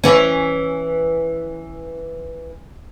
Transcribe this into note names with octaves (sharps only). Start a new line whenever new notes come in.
E3 C#4